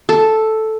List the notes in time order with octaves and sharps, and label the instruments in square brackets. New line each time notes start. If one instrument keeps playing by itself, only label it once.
[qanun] A4